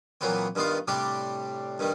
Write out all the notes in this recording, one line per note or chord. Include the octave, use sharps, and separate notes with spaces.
A#2 E3 F#3 B3 C4
G2 D#3 B3 F4 F5
A2 C3 G3 D4 G4
G2 D#3 G3